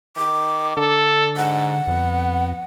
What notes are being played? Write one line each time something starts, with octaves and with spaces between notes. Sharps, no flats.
D#3 D6
D3 A4
G#2 F#5
F2 B3